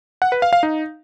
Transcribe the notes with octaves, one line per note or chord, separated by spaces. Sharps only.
F#5
B4
F5
F5
D#4